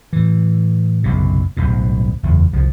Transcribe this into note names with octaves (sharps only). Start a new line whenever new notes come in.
A2 E3
F#1 B1 C3
D1 B1 G2 B2
F#1 E2
C2 D3 F3